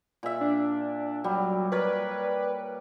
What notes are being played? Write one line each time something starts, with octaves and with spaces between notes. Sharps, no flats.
A#2 E5
D4
F#3 G3
A#4 B4 C#5 D5